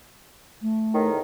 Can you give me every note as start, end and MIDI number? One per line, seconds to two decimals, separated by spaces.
0.61 1.08 57
0.94 1.19 40
0.94 1.19 45
0.94 1.19 51